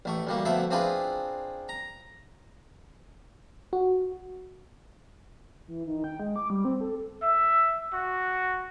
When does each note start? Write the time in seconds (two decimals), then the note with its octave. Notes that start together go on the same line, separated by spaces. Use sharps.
0.05 A1 A3 C#6
0.27 D2 G3 A#3
0.45 D2 F3 A3 B3 E5 C#6
0.71 C4 D4 F4 G#4 B4
1.69 A#5
3.73 F#4
5.68 E3
5.87 D#3
6.04 G5
6.20 G#3
6.36 D6
6.50 G3
6.65 C4
6.81 A4
7.22 E5
7.93 F#4